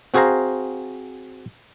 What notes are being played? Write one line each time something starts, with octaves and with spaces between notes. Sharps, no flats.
C4 F#4 G#4 C5 F5 A#5